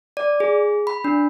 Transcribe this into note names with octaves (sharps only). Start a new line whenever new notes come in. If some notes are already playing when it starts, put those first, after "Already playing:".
D5
G#4
B5
D4